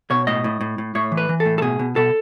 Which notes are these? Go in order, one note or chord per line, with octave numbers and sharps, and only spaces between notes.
B2 C#5
A2 D#5
A2
A2
A2
A2 C#5
E3
B4
E3
A4
A2
A4
B2 G#4
B2
B2 A4